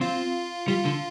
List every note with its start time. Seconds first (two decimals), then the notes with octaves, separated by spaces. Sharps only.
0.01 C4 F4
0.68 G3 F4
0.85 D3